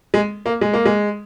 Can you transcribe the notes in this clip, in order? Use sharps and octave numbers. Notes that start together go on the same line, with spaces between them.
G#3
A#3
G#3
A#3
G#3